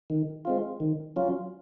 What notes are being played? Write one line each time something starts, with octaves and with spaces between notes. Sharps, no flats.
D#3
G#3 C4 F4
D#3
F#3 C#4 F4